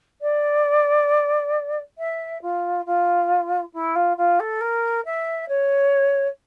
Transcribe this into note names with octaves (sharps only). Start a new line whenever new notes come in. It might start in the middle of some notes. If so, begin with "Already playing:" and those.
D5
E5
F4
F4
E4
F4
F4
A4
A#4
E5
C#5